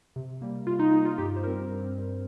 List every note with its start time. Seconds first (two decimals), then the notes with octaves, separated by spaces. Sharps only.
0.16 C3
0.42 G3 A#3
0.67 C3 F4
0.79 D#4
0.93 G3 A#3 D#4
1.05 F4
1.18 G2 G4
1.36 C5
1.44 G3 C4 A#4
1.70 G2
1.96 G3 C4